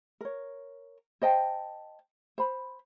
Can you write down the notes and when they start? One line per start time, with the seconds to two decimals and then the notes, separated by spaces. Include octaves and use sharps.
0.21 A#4 C#5
1.22 C5 D#5 G5 A5
2.38 C5 B5